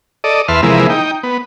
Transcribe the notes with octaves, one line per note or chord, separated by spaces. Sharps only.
A4 D5 D#5
E2 B4 E5 A5 C6 F6
C3 E3 F3 G#3 A#3 E4
D#4 G5
B3